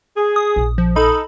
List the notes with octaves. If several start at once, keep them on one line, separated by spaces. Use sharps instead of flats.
G#4
D#6
A#1
F3
D#4 A4 B5